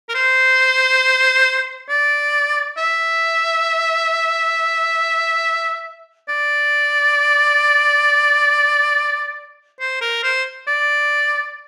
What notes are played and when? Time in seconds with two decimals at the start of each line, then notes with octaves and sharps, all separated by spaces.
0.09 A#4
0.14 C5
1.89 D5
2.77 E5
6.29 D5
9.80 C5
10.01 A#4
10.23 C5
10.67 D5